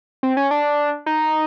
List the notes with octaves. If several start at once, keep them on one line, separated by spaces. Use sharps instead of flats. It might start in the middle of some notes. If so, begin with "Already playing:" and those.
C4
C#4
D4
D#4